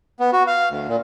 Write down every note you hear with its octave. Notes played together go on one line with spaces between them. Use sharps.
B3
F#4
F5
D2
A#2